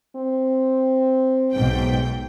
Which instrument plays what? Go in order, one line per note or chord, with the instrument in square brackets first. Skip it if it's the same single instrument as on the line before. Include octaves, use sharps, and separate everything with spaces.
[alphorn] C4
[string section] B1 G#2 G5